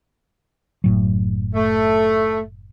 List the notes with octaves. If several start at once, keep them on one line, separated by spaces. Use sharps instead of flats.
F#1 A2 F#3
A3